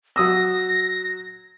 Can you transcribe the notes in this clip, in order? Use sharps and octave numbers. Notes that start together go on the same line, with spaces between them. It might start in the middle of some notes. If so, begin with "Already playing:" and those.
F#3 D#6 E6 A#6